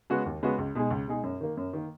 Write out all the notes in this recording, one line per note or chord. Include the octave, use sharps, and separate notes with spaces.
C#3 G#3 B3 F#4
D#2
C#3 G#3 B3 F#4
C#2
B2 G#3 D#4 G#4
C#2
B2 G#3 D#4 G#4
F#2
D#3 A#3
F#2
D#3 A#3